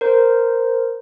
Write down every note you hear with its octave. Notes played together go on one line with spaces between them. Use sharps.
A#4 C5